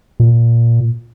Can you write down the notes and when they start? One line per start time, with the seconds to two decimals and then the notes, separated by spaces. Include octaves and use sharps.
0.20 A#2